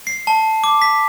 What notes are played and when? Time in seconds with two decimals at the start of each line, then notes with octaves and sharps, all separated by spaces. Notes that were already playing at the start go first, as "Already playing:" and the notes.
0.07 C7
0.27 A5
0.64 D6
0.82 B6